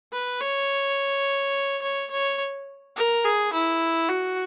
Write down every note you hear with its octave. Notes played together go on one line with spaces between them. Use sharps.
B4
C#5
C#5
C#5
A#4
G#4
E4
F#4